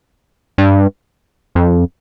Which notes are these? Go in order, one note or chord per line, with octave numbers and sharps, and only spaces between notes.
G2
F2